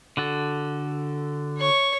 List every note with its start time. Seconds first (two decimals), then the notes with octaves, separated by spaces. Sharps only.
0.17 D3 F#4 A4
1.58 C#5 C#6